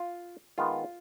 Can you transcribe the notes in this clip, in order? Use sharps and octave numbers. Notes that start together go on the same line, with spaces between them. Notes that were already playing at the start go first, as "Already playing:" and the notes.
Already playing: F4
D#3 G#3 B3 F4